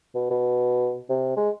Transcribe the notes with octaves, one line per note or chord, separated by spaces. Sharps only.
B2
B2
C3
G#3